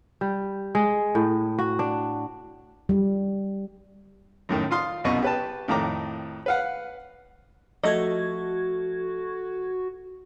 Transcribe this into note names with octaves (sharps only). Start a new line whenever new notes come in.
G3
G#3
A2
F#4
D4
G3
F#2 A2 D#3
F4 F5 C6 D#6
C2 F#2 B2 D#5 C#6
G4 B4 A5
F2 A2 D#3 A#5 D6
B4 F5 F#5
F3 A3 F#4 A4 D#5 G#6